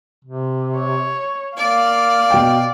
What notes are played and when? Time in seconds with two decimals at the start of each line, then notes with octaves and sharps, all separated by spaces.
0.25 C3
0.77 C#5
1.57 A#3 D5 F5
2.30 B2 G5